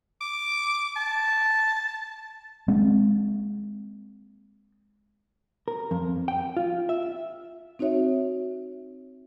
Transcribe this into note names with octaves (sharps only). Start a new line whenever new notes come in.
D6
A5
G#3 A#3 C4
A#4
F2
G5
F4
E5
C4 D#4 F#4 C#5 E5